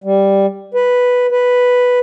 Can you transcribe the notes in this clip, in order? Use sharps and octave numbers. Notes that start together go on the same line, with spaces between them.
G3
B4
B4